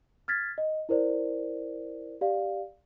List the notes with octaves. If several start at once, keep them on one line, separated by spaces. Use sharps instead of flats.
F6 G#6 A6 B6
D#5
E4 A#4 C5 D5
G4 D5 F5